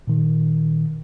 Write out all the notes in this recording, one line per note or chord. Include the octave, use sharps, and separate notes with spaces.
A#2 D#3